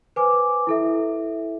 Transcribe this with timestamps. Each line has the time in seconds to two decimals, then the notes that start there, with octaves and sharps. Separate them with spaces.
0.16 B4 C5 G#5 D6
0.67 E4 A4 E5